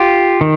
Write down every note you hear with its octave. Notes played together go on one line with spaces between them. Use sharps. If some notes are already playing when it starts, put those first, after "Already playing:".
Already playing: F4 G4
D#3